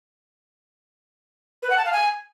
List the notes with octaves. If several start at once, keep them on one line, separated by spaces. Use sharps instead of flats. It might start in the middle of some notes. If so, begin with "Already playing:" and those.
B4
F#5
A5
F5
G#5